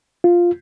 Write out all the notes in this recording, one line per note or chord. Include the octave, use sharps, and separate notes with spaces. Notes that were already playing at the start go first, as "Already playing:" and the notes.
F4